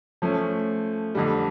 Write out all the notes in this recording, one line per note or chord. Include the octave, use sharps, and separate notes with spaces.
F3 A3 C#4
F2 D3 G3